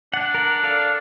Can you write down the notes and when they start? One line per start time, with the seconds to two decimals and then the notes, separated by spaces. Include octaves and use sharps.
0.14 D4 F#5
0.35 A#4 F#5
0.64 A4 D5 F5